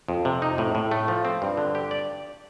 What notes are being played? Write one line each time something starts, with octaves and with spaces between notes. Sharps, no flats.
F2
C3
D#4
A2
A2
A3
F3
C4
G2
D3
G4
D5